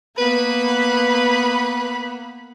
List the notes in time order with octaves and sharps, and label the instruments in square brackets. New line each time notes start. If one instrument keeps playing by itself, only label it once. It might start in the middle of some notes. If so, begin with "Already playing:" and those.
[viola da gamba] A#3 B3 [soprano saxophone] B4 [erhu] B5